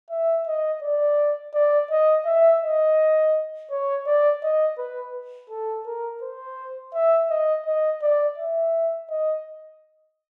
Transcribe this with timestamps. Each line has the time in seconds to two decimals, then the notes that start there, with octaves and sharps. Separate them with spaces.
0.10 E5
0.47 D#5
0.82 D5
1.54 D5
1.90 D#5
2.26 E5
2.62 D#5
3.70 C#5
4.06 D5
4.42 D#5
4.78 B4
5.50 A4
5.86 A#4
6.22 C5
6.93 E5
7.30 D#5
7.66 D#5
8.02 D5
8.38 E5
9.10 D#5